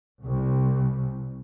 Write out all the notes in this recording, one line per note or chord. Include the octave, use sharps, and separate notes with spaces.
C2